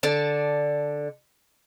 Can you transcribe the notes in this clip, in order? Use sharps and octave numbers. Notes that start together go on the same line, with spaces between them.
D3 D5 A5